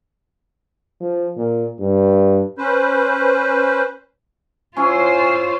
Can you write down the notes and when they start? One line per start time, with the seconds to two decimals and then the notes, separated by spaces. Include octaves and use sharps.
1.01 F3
1.37 A#2
1.79 G2
2.58 C#4 B4 C5
4.77 C#4 E4 F4 C5 C#5 G#5